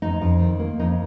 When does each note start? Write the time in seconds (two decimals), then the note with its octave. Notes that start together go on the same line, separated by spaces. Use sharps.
0.02 F2 D#4
0.21 F2
0.41 D#3
0.60 A#3
0.79 F2 D#4